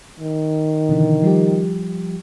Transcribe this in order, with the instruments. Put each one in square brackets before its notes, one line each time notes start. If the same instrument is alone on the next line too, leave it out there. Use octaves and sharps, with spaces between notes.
[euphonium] D#3
[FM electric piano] B2 D3 E3
F3 G3 G4